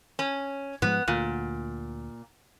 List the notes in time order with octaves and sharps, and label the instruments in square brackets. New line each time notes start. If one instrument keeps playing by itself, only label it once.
[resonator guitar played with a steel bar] C#4
[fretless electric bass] G#2 F3 G#3 [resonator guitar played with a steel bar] B3
[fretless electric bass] D2 [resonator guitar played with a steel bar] A#2